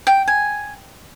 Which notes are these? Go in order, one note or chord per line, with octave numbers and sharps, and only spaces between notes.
G5
G#5